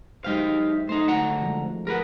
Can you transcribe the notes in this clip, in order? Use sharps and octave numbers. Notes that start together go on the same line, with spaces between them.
F#3 G#3 D#4 G4 C5 F5
E5
A3 D#4 C5
D2 F#5 A#5
F3 G#3
G#4 A#4 B4 F#5